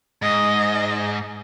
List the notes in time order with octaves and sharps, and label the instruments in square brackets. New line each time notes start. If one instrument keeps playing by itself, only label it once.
[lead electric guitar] G#2 [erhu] D#5